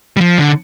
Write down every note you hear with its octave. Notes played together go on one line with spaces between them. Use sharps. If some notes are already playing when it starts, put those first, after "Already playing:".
G3
F3
D3